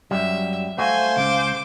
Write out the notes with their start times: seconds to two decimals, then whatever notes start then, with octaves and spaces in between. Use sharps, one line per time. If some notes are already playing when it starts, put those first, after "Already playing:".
0.11 F#2 F#3 G3 E5
0.78 A3 F#4 C5 F5 G#5
1.17 C#2 C#3 D6